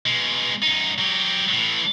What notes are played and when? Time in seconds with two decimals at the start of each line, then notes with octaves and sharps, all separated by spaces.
0.06 B2 G#3
0.63 F#2 D#4
0.99 F#3 G4
1.53 A2 E3